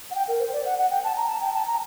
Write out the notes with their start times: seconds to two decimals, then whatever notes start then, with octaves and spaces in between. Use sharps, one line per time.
0.11 F#5
0.15 G5
0.28 A#4
0.40 C5
0.53 D5
0.66 F#5
0.78 F#5
0.91 G5
1.04 A5
1.17 A#5
1.28 A5
1.41 G5
1.54 A5
1.67 A#5